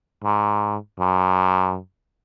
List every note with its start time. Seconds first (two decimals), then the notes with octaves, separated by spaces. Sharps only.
0.24 G#2
1.00 F#2